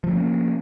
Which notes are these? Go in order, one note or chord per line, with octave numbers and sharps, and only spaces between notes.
F3 A3 A#3 C#4